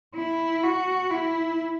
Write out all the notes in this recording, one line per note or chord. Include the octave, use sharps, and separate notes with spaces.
E4
F#4
E4